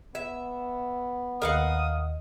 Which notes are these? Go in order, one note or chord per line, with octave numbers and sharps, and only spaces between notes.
B3 E5
D#2 A#4 D#5 F5 F#5 D#6